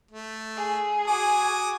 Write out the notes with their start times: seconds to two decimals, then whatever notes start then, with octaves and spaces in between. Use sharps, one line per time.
0.11 A3
0.56 G#4
1.07 F#4 G#5 D6 D#6